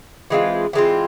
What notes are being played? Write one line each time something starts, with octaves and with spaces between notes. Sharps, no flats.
E3 G#3 C4 F4
E3 G#3 C4 F4